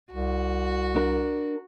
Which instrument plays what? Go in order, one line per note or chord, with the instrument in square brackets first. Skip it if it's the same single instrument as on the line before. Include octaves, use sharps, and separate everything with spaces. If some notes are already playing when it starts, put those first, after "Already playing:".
[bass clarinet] C2 [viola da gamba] F#4
[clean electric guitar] D4 A#4